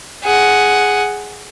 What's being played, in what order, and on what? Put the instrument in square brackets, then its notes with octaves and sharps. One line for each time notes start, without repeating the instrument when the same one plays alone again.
[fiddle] G#4 F#5